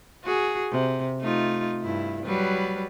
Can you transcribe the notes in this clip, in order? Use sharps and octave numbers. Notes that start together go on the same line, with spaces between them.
F#4 G#4
C3
A3 D#4 F4
G2 E4
F#3 G3 B4